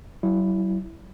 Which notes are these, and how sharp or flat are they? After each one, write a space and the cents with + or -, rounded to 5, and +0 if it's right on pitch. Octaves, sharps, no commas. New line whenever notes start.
F#3 +40 E4 +0